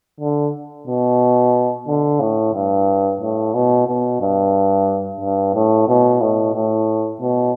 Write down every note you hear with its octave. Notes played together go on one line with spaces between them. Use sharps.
D3
B2
D3
A2
G2
A2
B2
B2
G2
G2
A2
B2
A2
A2
B2